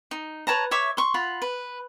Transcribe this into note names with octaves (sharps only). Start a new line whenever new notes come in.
D#4
B4 C#5 A5 A#5
C#5 E5 C#6 D6
C6 C#6
F4 F#5 B5
B4